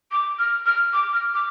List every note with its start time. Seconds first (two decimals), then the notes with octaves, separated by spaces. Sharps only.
0.11 D6
0.38 F6
0.66 F6
0.92 D6
1.13 F6
1.34 D6